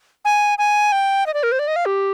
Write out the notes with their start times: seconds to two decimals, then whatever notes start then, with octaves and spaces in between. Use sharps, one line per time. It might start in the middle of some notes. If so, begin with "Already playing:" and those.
0.25 G#5
0.58 G#5
0.92 G5
1.26 D#5
1.34 D5
1.43 A#4
1.52 C5
1.59 D5
1.68 D#5
1.76 F5
1.86 G4